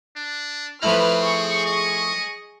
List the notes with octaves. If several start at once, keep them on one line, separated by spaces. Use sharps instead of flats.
D4
F3 A3 C4 E4 B4 B5 F6
G#4 C#6
D#5